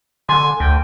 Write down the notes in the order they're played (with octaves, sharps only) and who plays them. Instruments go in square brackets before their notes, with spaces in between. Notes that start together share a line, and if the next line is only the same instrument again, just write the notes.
[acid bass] D3 [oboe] G#5 [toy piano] C6
[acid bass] D2 [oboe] G5